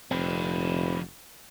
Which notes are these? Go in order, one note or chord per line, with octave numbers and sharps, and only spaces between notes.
F1 F2 D3 C4 B4